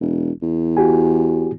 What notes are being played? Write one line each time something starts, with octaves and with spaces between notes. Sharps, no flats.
E1
E2
F#4 G4 G#5